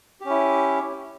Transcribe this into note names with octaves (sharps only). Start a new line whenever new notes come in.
C#4 E4 G4